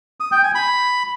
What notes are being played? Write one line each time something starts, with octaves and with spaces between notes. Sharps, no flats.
D#6
G5
G#5
B5